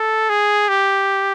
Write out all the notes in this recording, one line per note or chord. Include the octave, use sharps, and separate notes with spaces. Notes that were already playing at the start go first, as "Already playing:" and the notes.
Already playing: A4
G#4
G4